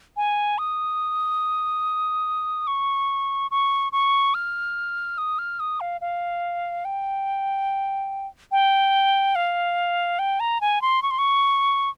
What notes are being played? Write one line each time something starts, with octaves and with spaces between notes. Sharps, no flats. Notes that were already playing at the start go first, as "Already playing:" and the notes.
G#5
D#6
C#6
C#6
C#6
F6
D#6
F6
D#6
F5
F5
G5
G5
F5
G5
A#5
G#5
C6
C#6
C6
C#6